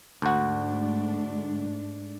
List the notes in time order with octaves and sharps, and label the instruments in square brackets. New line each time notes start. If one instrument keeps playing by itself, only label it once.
[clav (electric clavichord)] D2 F#4 [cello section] G#2 A3 D4